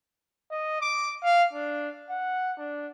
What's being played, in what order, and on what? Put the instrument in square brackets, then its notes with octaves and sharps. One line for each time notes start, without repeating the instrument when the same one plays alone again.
[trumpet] D#5
D6
F5
D4
F#5
D4